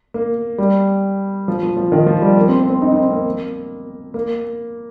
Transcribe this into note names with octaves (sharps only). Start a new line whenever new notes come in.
A#3
G3
F3
F3
F3
D#3
F3
G3
A#3
C4
C4
C4
D#4
D#4
C4
A#3
A#3